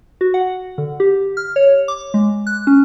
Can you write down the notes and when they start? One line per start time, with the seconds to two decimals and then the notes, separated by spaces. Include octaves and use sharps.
0.21 F#4
0.34 F#5
0.78 D3
1.00 G4
1.37 F6
1.56 C#5
1.88 D6
2.14 G#3
2.47 F#6
2.67 C#4